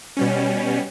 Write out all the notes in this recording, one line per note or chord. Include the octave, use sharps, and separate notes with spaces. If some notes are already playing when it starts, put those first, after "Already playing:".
B2 G3 C#4